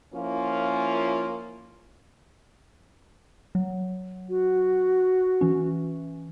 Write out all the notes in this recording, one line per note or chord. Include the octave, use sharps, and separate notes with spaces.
F3 A#3 C#4 E4 F4
F#3
F#4
E3 C#4